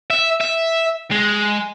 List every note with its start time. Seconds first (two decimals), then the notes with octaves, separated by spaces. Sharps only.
0.10 E5
0.40 E5
1.12 G#3